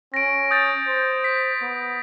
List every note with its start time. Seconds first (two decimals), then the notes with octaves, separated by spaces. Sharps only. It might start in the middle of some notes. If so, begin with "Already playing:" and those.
0.14 C#4 A#6 D7
0.51 D#6 G6 A6
0.88 C5
1.24 B6
1.61 B3